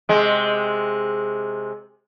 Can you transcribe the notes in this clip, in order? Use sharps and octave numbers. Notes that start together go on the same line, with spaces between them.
C3 G#3